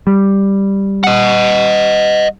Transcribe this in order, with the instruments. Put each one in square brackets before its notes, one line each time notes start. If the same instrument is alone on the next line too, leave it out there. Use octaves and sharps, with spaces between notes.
[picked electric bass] G3
[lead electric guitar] D#5 F#5